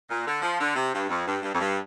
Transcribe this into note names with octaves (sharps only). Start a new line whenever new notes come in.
A#2
D3
F3
D3
C3
G2
F2
G2
G2
F2
G2